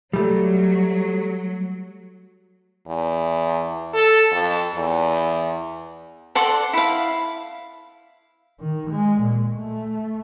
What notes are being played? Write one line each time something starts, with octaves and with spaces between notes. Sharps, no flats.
F#3 G3 A3
E2
A4
F2
E2
A4 D5 F#5 C6
E4 F5
D#3
G#3
A#2
A3